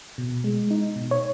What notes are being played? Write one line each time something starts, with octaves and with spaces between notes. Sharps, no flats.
B2
G#3
D#4
B2
C#5